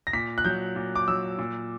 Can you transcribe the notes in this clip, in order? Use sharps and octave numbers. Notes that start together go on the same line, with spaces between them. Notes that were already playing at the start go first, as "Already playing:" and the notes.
A#6
A#2 B6
F#6
F#3 G6
A#2
D6
F#3 E6
A#2